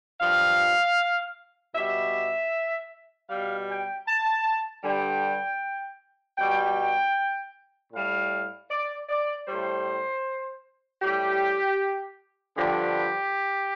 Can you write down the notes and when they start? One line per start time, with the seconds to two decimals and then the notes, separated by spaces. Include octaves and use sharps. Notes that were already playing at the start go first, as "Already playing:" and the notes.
0.21 G2 F3 F5
1.75 B2 G3 E5
3.29 B2 G3 F5
3.68 G5
4.07 A5
4.84 G2 D3 G3 G5
6.38 B2 G3 G5
7.93 A2 G3 F5
8.70 D5
9.09 D5
9.47 A2 G3 C5
11.02 A2 G3 G4
12.57 G2 D3 F3 G4